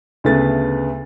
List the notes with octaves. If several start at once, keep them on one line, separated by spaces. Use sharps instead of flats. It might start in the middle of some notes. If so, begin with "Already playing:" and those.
D2 C#3 A3 B3 A6